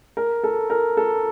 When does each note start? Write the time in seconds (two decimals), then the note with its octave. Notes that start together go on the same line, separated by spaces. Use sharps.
0.17 A#4
0.44 A4
0.70 A#4
0.97 A4